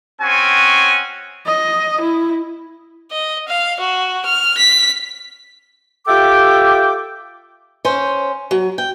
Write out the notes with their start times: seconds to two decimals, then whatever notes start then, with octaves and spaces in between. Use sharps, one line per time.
0.21 C4 C#4 F#4 G#5
1.46 D#5
2.01 E4
3.11 D#5
3.48 F5
3.80 F#4
4.25 F6
4.57 B6
6.08 F4 G4 A4 E5 G5 D6
7.85 C#4 C5
8.51 F#3
8.78 G5